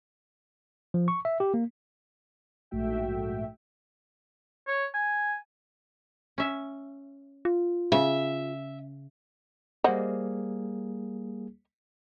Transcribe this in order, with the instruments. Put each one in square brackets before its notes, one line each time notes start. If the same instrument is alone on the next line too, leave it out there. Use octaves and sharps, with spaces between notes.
[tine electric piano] F3
C#6
E5
G4
A#3
[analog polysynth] A#1 G#2 A3 F#4 E5 G5
[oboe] C#5
G#5
[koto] C#4 E5
[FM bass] F4
[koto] C#3 [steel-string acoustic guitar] E5
[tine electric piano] G3 A#3 G#4 [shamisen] C5 D#5 F#5